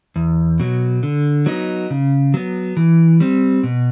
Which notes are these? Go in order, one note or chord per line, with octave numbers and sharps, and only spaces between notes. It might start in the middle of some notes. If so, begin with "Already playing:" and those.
E2
B2 F#3
D3
F#3 B3 D#4
C#3
F#3 B3
E3
G3 C4
B2